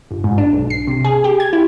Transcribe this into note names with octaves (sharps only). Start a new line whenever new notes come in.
G1
G#2
D4
B1
C7
C3
G#4
G4
G#6
E4